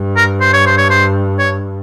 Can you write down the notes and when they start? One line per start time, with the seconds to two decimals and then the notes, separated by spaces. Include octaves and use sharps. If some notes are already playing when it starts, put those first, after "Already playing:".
Already playing: G2
0.17 A#4
0.41 C5
0.53 C#5
0.66 C5
0.78 C#5
0.90 C5
1.39 C#5